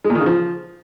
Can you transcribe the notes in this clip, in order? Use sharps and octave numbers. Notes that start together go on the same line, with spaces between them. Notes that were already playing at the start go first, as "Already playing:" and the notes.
G#3
A#2
D#3
C#3
F3